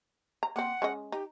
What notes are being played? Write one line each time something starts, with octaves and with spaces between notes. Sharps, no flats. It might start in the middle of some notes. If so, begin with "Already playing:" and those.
A#5
A#3 C4 F#5
G#3 C#4 D#5
D#4 G4